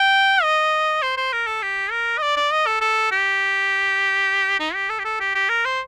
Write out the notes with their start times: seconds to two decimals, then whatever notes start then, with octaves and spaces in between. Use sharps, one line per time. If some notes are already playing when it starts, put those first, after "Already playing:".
Already playing: G5
0.43 D#5
1.03 C5
1.17 C5
1.32 A#4
1.47 A4
1.62 G4
1.91 A#4
2.18 D#5
2.22 D5
2.36 D5
2.52 D#5
2.67 A4
2.81 A4
3.12 G4
4.60 D#4
4.74 G4
4.90 A4
4.99 G4
5.05 A4
5.20 G4
5.35 G4
5.49 A#4
5.65 C5